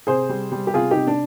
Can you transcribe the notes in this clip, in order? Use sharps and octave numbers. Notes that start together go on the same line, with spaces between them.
C3 G#4 C5
G3
G3
G4
C3 F4 G#4
D#4 G4
C3
D4